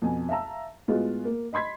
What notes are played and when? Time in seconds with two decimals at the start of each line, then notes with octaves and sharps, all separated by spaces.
0.02 F2 B2 G#5
0.29 E5 F5 A5 A#5 E6
0.88 A2 G#3 B3 F4 F#4 G#4
1.25 A#3
1.53 D#5 B5 C6 G#6 B6